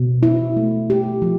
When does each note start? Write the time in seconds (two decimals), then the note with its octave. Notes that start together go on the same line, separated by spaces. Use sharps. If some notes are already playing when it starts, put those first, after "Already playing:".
Already playing: B2
0.23 E4
0.57 A3
0.90 G4
1.22 F3